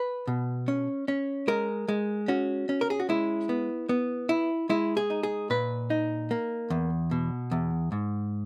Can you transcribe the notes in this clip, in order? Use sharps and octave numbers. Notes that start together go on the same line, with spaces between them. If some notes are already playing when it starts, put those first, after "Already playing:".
Already playing: B4
B2
C#4
C#4
G#3 A#4
G#3
C#4 F#4
C#4
A#4
G#4
F#4
G#3 E4
B3
B3
E4
G#3 E4
G#4
D#4
G#4
A#2 B4
D#4
A#3
E2
B2
E2
G#2